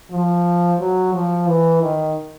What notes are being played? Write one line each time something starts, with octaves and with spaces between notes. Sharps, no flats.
F3
F#3
F3
E3
D#3